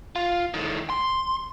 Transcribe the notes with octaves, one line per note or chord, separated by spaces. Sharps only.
F4
A2 D#3
C6